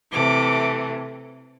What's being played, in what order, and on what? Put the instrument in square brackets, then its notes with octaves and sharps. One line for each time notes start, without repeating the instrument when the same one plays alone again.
[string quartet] C3 E3 A3 D6